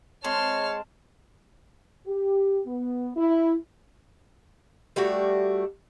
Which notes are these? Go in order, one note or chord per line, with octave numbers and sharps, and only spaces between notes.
G#3 C4 C#5 A5 F6
G4
B3
E4
G3 A3 D4 F#4